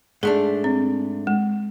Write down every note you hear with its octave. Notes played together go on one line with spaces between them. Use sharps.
G#2 A3 D4 G#4
C4
G#3